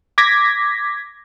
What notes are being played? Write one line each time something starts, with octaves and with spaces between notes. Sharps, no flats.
D6 G#6 A#6 B6